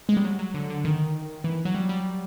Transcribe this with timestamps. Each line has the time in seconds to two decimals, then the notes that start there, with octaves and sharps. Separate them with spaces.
0.09 G#3
0.17 G3
0.25 F#3
0.39 F#3
0.54 D3
0.70 D3
0.85 D#3
1.44 E3
1.65 F#3
1.74 G3
1.89 G3